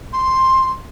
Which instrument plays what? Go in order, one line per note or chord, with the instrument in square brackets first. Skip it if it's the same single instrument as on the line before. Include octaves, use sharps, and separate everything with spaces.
[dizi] C6